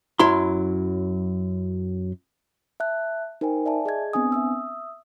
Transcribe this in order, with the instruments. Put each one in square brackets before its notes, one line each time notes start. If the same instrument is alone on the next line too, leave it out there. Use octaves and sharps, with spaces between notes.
[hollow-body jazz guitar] F#2 F#3 E4 B5 C6
[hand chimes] E5 A5 F#6
D#4 A#4 C5 G5 G#5
D5 E5 G#5 A5
G#4 D#5 G#6
B3 C4 D4 G#5 D#6
E5 D#6 E6